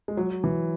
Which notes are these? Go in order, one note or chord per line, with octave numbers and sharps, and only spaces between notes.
G#3
F#3
E3